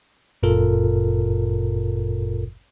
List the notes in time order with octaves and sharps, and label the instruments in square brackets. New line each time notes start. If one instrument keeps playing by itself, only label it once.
[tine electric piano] G1 F#2 A#2 F4 A4 A#4